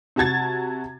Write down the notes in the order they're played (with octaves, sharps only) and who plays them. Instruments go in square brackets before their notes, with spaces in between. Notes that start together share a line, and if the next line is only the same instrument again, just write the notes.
[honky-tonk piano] C3 F#4 A5 G#6 A6